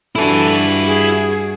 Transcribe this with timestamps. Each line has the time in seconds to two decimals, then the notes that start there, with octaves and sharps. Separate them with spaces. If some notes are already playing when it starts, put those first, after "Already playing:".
0.16 G2 D4 E4 F#4 A4 G#5
0.87 G#4